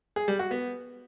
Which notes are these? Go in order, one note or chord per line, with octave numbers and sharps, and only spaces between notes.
G#4
G3
F#4
B3